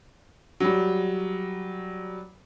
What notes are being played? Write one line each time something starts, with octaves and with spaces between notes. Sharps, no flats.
F#3 G3